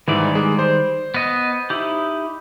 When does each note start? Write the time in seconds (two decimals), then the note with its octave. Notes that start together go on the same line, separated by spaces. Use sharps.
0.08 G#2 D#3 E3 G3 D5
0.35 G#3
0.59 C5
1.14 B3 D#5
1.70 D#4 E4 G4